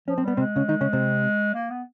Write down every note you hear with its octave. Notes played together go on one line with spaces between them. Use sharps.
F3 C#4
C4
G3 B3
C3 C4
G#3
C#3 C#4
D#3 D#4
C#3 C#4
C3 C4
A#3
B3